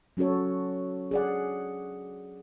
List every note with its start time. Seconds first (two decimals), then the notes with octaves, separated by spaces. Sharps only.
0.17 F#3 C#4 F#4 A4 C#5
1.11 G#4 D5 F#5